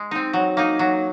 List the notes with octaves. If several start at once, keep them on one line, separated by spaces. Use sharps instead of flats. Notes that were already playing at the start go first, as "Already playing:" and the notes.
Already playing: G#3
C4 D#4
F#3
A#3 D#4
F#3